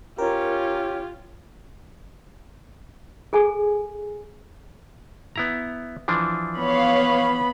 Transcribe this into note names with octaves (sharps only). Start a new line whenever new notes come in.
C#4 F4 G4 A#4
G#4 A4 G#5
B3 E4 A#5
E3 F3 D4
B3 C#5 F5 B5